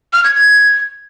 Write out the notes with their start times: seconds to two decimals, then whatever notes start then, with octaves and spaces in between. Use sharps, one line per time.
0.13 F6
0.24 G#6
0.35 G#6